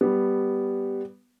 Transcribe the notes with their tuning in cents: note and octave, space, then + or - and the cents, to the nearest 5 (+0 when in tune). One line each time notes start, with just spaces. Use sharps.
G3 +0 B3 +0